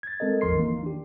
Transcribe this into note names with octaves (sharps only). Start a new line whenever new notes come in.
G#6 A6
G#3 C4 A4 A#4 D#5
G#1 E2 F3 A#4 C6 C7
D#3 E3 A#3
D4 G4